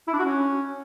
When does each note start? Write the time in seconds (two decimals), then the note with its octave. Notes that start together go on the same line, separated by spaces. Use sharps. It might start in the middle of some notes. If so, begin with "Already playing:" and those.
0.07 E4
0.13 D4
0.19 F#4
0.25 C#4